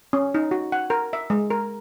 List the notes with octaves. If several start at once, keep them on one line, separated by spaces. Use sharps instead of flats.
C#4
D#4
F#4
F#5
A#4
E5
G#3
A#4